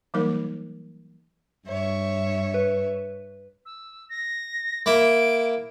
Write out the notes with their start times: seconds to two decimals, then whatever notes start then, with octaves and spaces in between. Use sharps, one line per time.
0.14 E3 F#3 G3 A#3 D#4 A#4
1.67 G2 C#5 E5
2.54 B4
3.66 E6
4.09 A#6
4.86 A#3 E4 D7